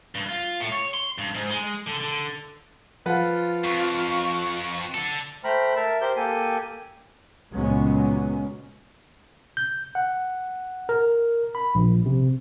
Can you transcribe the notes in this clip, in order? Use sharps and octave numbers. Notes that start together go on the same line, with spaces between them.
G2
F4
A2
C#5
C6
G2
G#2
G#3
D3
D3
F3 F4 B4 F#5
F2 C#6
D4 A4
A3 C5 G5 A#5 B5 F6
A#4 E5 A5
G4 A#4 C5 G6
A#3 G4 A4 G5 G#5
C#2 A#2 F#3 G#3 B3 C#4
G6
F#5
A#4
B5
A#1
C3